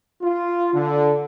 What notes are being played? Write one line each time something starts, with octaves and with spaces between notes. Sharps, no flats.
F4
D3